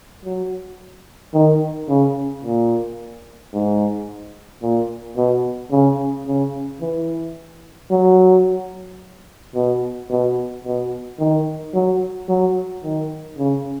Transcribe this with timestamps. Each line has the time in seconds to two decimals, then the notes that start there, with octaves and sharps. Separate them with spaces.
0.25 F#3
1.34 D#3
1.89 C#3
2.43 A#2
3.53 G#2
4.62 A#2
5.17 B2
5.72 C#3
6.27 C#3
6.81 E3
7.91 F#3
9.55 B2
10.10 B2
10.64 B2
11.19 D#3
11.74 F#3
12.29 F#3
12.83 D#3
13.38 C#3